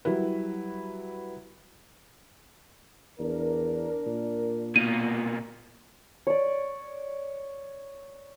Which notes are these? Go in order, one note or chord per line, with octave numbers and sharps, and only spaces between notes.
F#3 G3 E4 B4
E2 D4 A#4
A#2
B2 A#3 D#7
C#5 D5